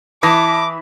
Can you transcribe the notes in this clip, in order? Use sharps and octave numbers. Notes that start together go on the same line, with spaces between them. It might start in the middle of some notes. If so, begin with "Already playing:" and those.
E3 A5 B5 D6 D#6 A#6